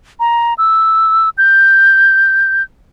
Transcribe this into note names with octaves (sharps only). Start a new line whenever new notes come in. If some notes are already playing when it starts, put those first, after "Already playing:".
A#5
E6
G6